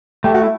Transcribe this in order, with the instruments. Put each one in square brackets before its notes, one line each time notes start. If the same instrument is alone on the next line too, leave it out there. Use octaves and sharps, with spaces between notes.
[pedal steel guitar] A3 [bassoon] G4
[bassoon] F#4
E4